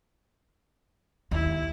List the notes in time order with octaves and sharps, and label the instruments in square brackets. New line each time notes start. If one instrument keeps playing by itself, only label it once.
[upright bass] D#2 [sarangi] E4